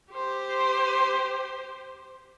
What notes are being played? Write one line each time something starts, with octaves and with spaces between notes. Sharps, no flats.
G4 C5